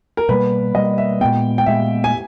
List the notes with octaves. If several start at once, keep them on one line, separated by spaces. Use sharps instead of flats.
A#4
B2 G3 A#3 B4
B2 G3 A#3 D#5
E5
A#2 G#3 B3 G5
G5
A#2 G#3 B3 E5
G#5